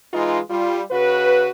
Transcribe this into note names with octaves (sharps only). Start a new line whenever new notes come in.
E3 G#3 D#4 F4
G3 F4
C#3 F#4 B4